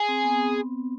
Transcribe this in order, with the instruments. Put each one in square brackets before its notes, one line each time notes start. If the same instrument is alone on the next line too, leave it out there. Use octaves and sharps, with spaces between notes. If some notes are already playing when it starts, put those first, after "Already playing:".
Already playing: [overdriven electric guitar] G#4
[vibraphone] C4
B3